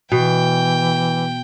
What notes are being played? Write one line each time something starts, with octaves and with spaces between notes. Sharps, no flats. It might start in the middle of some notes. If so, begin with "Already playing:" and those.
B2 E3 G5